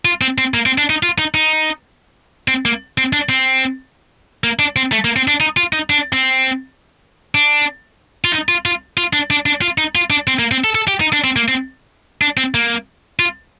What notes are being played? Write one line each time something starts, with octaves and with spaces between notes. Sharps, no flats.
F4
C4
C4
A#3
C4
D4
D#4
F4
D#4
D#4
C4
A#3
C4
D4
C4
A#3
D4
C4
A3
A#3
C4
D4
D#4
F4
D#4
D4
C4
D4
F4
D#4
F4
F4
F4
D4
D4
D4
F4
D#4
F4
D4
C4
A#3
C4
A4
A4
G4
D#4
D4
C4
A#3
C4
D4
C4
A#3
F4